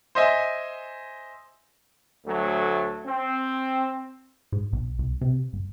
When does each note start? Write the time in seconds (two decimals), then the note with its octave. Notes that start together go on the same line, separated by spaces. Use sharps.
0.15 C5 D#5 E5 G#5
2.25 D2 F#3 A3
3.06 C4
4.52 G#2
4.73 B1
4.99 C2
5.21 C3
5.53 G1